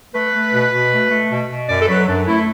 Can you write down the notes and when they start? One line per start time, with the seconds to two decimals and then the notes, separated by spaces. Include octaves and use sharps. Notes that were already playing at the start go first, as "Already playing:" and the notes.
0.14 A3 B4
0.34 A3
0.52 B2
0.71 B2
0.91 A3
1.10 A3
1.31 B2
1.49 B2
1.68 F#2 D5
1.81 A4
1.88 F#3 B4
2.07 F#2 D4
2.27 A3 E4